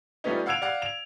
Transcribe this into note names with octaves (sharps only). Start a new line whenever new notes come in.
F3 G3 A3 B3 C#4 D#4
F5 F#5 E6 G#6 D7 F7
D5 F5 F#5
D7 F7